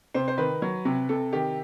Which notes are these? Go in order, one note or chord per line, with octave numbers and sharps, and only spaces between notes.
C3 C5
C5
D#3 B4
F#3
C3
C3 A4
D#3 G4